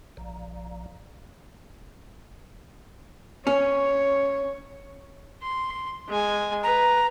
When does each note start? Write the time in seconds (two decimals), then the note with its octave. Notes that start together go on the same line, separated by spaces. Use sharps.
0.17 A#1
3.47 C#4 C#5
5.42 C6
6.08 G#3 G#5
6.63 B4 A#5